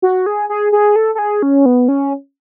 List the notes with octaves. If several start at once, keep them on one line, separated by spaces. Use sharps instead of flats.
F#4
G#4
G#4
G#4
A4
A4
G#4
C#4
B3
C#4